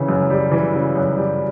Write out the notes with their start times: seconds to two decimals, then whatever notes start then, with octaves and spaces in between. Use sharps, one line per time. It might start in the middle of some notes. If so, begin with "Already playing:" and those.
Already playing: C#3 E3
0.09 F#2
0.30 G3
0.52 E3
0.74 C#3
0.96 F#2
1.17 G3